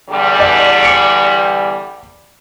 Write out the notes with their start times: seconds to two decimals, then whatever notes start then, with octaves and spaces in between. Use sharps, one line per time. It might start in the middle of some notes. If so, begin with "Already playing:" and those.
0.10 E2 D3 G3
0.40 D5 D#5
0.83 D6 C#7 D7